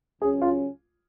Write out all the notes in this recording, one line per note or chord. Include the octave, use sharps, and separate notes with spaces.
C#2 C#3 F#3 C#4 G#4
F4